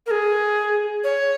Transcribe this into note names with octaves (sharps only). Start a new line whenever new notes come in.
A#4
G#4
C#5